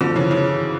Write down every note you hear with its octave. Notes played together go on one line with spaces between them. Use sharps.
D3 F3
C#3 E3
C#3 E3